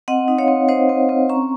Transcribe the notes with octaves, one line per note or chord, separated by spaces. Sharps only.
C4 D#5 F#5
D#4
C#5 F5
C4
D#4 C5 D#5
C4
C4
C#4 A#5 C#6